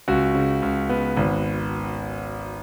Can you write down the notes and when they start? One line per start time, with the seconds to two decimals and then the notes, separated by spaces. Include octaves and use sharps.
0.08 C#2 F#4
0.35 C#3
0.62 C#2
0.89 B3
1.17 G#1